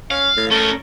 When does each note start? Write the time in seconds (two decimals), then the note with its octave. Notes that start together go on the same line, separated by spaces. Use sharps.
0.11 C#4 F5
0.37 A2
0.51 A3 C#4 A#4